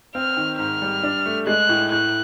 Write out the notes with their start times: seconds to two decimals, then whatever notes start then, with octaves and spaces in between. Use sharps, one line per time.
0.15 C4 F6
0.37 D#3
0.59 G#2 F6
0.82 G3
1.03 D4
1.26 A3
1.47 G#3 F#6
1.69 A2
1.92 A2 F#6